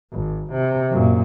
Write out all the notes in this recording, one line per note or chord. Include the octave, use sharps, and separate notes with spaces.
G#1
C3
F#2 A#2